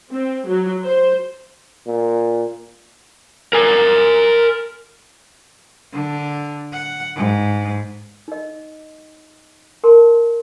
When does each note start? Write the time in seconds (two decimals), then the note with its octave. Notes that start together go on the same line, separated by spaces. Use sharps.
0.11 C4
0.48 F#3
0.83 C5
1.87 A#2
3.53 A#4 G#5
5.93 D3
6.73 F#5
7.16 G#2
8.28 D#4 D#5
9.84 A#4 A5 C6